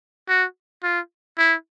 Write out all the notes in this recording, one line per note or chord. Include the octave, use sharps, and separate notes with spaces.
F#4
F4
E4